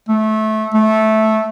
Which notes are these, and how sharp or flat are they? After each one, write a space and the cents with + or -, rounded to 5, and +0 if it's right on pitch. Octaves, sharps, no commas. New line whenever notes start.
A3 -20
A3 -10